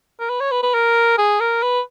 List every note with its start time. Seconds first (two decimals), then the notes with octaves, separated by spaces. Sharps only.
0.20 A#4
0.30 B4
0.40 C#5
0.51 B4
0.63 B4
0.75 A#4
1.18 G#4
1.40 A#4
1.63 B4